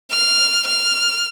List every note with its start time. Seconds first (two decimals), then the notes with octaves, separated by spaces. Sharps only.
0.11 F6
0.66 F6